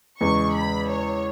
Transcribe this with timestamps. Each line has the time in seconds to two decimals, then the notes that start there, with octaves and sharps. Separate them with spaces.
0.20 E2 C#3 G#3 C#6
0.55 B5
0.89 C#5